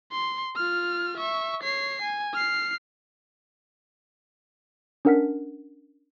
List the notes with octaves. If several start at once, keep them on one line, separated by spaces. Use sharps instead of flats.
C6
F4 F6
E5 C#6
C#5 C7
G#5
F6 C7
C#4 D4 A#4 F#5 F6 B6